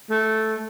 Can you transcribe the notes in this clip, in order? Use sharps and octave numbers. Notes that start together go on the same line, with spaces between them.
A3